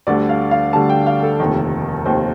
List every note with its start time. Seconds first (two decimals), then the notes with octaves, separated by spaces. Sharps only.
0.07 D2 D3 G3 D5
0.29 F5
0.51 F5
0.73 D2 D3 G3 A5
0.89 G5
1.06 F5
1.23 A4
1.40 F1 D#2 D#3
2.05 F1 D#2 D#3 C5